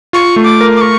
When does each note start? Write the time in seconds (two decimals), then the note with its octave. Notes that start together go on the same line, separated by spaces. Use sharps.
0.13 F4 C#6
0.36 A3
0.44 D6
0.61 A#4
0.76 D6
0.81 A#4 C#6